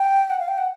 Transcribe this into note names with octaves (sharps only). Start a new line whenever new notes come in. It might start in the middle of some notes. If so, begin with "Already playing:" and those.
Already playing: G5
F#5
F5
G5
F#5